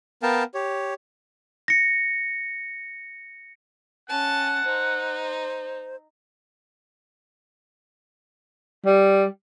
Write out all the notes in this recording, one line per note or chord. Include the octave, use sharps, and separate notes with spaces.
B3 A#4 F5 G5 A5
G4 C#5
A#6 C#7
C#4 F#5 A5
D#4 C5
G3